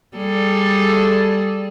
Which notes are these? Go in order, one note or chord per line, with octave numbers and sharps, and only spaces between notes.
G3 G#4 A4